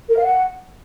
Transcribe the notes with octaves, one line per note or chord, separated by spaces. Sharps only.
A#4
F5
F#5